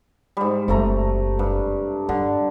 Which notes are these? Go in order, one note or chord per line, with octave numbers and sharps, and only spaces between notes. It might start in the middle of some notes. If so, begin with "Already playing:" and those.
G#2 G3
F#1 F#2 C3 A3 A#5
G2
G2 D3